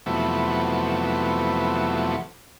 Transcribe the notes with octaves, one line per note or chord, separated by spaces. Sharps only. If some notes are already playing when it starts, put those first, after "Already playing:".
F2 C3 E3 F#3 A3 B3